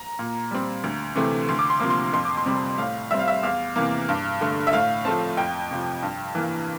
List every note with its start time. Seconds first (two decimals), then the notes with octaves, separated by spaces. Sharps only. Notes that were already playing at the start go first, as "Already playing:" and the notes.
Already playing: A#5
0.19 A#2
0.51 G3 C4
0.84 D2
1.16 C3 E3 A3 C4
1.49 D2 C6
1.59 D6
1.70 C6
1.80 C3 F3 A#3 D6
1.90 C6
2.13 F2 C6
2.25 D6
2.37 C6
2.46 C3 G3 C4
2.78 A2 F5
3.11 G3 C4 E5
3.19 F5
3.28 E5
3.43 E2 F5
3.76 C3 E3 A#3
4.09 G2
4.41 D3 A3
4.67 E5
4.73 A2 F5
5.05 F3 A3 C4 A5
5.37 F2 G5
5.71 C3 F3
6.03 G2
6.35 E3 A#3